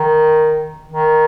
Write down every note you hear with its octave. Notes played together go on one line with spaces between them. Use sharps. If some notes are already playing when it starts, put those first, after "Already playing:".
Already playing: D#3
D#3